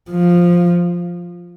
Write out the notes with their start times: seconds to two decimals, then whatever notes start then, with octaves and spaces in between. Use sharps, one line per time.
0.11 F3